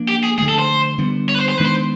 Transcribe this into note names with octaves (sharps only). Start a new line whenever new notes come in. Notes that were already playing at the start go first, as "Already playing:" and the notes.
Already playing: F3 A#3 D4
G4
G#4
D3 F3 A3 G#4
A4
C5
D3 G3 B3
C#5
B4
C5
C5
D#3 G#3 B3 D4 B4
C5